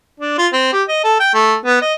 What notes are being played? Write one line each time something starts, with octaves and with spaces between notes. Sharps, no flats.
D4
F4
C4
G4
D#5
A4
G5
A3
B3
D#5